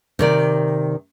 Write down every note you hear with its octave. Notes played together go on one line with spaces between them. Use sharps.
C3 D#3 D5